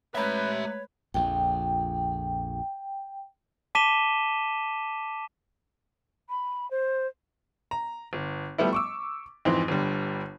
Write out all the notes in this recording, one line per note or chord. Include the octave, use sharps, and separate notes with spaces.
G#3 A3 B4 C#5 E5 A#5
A#1 F2 G5
A5 D6 B6 D#7 E7 G7
B5
C5
A#5
G1
F3 G3 A3 B3 E4
C#6 D6 E6
F2 G#2 E3 C4
G1 D3 G3